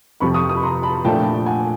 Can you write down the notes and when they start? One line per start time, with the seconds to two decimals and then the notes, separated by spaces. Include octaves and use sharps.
0.20 F2 C3 F3 B5 C#6
0.34 C#6 D#6
0.48 C#6 D#6
0.56 B5
0.63 A#5 C6
0.83 A5 B5
1.05 A#2 F3 A3 D4 G5 A5
1.46 F#5 G#5